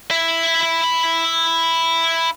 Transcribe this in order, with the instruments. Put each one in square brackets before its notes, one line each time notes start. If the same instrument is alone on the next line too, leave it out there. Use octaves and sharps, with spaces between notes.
[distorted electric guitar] E4 E5